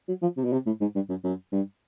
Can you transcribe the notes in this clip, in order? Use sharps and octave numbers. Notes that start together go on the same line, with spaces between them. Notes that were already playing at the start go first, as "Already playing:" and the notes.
F#3
F3
C3
B2
C3
A2
G#2
G2
F#2
F#2
G2